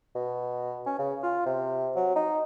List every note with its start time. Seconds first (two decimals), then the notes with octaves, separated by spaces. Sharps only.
0.15 B2
0.86 C#4
0.99 C#3
1.23 F4
1.46 C3
1.96 F#3
2.16 D#4